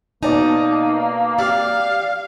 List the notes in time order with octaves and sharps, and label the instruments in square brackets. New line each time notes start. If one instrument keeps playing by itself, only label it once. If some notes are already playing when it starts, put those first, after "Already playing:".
[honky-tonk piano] B2 D5 A5 [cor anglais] A#3 [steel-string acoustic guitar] D#4
[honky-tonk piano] G4 [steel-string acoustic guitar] D5 [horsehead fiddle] F5